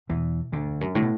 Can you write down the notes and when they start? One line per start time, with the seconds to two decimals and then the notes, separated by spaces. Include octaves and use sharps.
0.09 E2 B2 E3
0.52 D2 D3
0.68 E2
0.81 F#2
0.95 A2 D3
1.02 B2